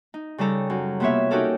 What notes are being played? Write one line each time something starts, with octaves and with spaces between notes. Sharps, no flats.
D#4
C#3 G3 D#4 A4 A#5
F#2
C3 A#3 B3 F4 C#5 E5
C#4 D#4 F#4 G4 A4 A#4